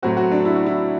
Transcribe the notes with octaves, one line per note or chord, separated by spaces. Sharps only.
A2 F#3 C4 F#4
F#4
D4
E4
F#4
E4